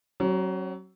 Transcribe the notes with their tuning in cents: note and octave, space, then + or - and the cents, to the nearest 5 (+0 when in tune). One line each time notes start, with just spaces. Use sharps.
F#3 +25 C#4 -40